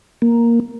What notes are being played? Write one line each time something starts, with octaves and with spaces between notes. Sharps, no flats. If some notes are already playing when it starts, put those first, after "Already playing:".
A#3